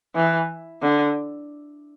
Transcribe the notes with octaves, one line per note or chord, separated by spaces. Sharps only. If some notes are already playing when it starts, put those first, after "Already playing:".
E3
D3